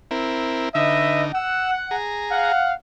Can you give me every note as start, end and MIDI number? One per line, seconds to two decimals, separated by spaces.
0.11 0.69 60
0.11 0.69 64
0.11 0.69 70
0.75 1.32 50
0.75 1.32 63
0.75 1.23 71
0.75 1.23 75
0.75 1.23 76
1.35 1.95 78
1.35 1.71 88
1.91 2.52 68
1.91 2.52 82
2.31 2.74 77
2.31 2.74 78